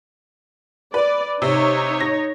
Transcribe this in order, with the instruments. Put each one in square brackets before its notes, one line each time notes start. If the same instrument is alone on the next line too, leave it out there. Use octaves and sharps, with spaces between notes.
[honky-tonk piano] B4 [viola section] D5
[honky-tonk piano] C3 [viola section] D#4 C#5
[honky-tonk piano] A#6